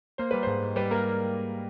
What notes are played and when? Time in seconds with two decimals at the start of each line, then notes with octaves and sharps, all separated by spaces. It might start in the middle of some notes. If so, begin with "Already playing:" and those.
0.18 A#3 C5
0.31 G3 B4
0.43 G#2 C5
0.63 G#2
0.76 G3 B4
0.91 A#3 A#4